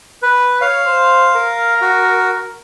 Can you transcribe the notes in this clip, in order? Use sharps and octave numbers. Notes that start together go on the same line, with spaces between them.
B4
C#5 F5
C5
A#4
F#4